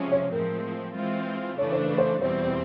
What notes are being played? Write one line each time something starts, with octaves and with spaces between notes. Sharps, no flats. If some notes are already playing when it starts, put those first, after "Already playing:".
Already playing: C3 F3 G#3 C#4
C#5
A2 F3 G#3 C4 A#4
E3 G#3 C4 F4
C#3 E3 A3 D4 C#5
C5
B4
C5
E2 B2 G3 C4 C5